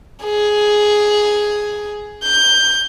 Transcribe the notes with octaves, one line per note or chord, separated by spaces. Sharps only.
G#4
G6